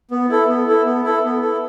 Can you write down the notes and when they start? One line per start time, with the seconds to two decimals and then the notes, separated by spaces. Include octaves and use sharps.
0.11 B3
0.29 E4 A4
0.48 B3
0.67 E4 A4
0.85 B3
1.04 E4 A4
1.23 B3
1.42 E4 A4